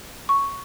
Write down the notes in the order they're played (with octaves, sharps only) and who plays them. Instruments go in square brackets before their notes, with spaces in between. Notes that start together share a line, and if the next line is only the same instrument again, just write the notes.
[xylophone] C#6